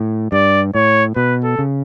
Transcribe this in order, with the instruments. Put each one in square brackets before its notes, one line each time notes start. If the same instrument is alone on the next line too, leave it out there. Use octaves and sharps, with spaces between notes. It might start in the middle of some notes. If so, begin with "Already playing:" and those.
Already playing: [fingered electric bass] A2
[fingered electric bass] G2 [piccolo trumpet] D5
[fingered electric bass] A2 [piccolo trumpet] C#5
[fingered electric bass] B2 [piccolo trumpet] B4
[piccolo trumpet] A4
[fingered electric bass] C#3